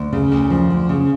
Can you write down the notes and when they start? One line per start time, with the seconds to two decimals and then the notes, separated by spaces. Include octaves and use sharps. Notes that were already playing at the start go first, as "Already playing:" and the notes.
Already playing: D2
0.13 C#3
0.32 D2
0.50 F3
0.70 D2
0.89 C#3